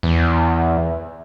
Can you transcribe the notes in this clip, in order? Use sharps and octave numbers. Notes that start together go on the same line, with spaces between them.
E2